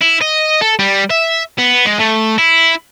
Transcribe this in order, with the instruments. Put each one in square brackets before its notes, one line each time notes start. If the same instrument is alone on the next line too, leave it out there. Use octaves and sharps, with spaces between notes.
[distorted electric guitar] E4
D#5
A4
G3
E5
B3
G#3
A3
E4